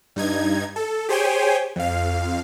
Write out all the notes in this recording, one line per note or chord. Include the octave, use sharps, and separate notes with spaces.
G2 D#4 G#6
A4
G4 G#4 C5 C#5 G5 G#5
F2 F5